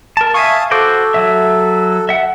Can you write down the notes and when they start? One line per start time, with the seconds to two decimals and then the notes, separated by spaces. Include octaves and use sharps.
0.17 A#4 A5
0.34 E5 F5 G#5 A5 C#6 D#6
0.71 F#4 A4 C5 D6
1.14 F#3 E5
2.09 E5 F#5